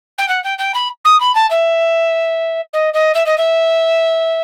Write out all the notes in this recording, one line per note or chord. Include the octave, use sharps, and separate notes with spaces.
G5
F#5
G5
G5
B5
D#6
B5
A5
E5
D#5
D#5
E5
D#5
E5